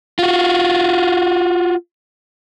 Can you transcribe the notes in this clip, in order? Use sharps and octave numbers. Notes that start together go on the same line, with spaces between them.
F4 F#4